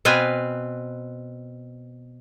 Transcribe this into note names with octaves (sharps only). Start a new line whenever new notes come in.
B2 C4 B4 F5 G#5